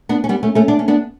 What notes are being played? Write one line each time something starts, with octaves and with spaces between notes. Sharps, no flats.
B3 D4
C#4
G3 B3
A3 C#4
A3 C#4
B3 D4
C#4
B3 D4